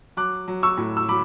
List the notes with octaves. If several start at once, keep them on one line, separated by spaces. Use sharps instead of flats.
F#3 D6 F#6
F#3
C#6 E6
A2
E6
F#3 B5 D6